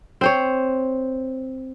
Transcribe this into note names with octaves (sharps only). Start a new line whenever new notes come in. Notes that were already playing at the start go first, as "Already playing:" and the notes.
C4 C5 C#5